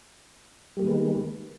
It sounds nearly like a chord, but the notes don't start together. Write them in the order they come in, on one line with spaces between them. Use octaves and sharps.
G3 A#3 G#3 D#3 B3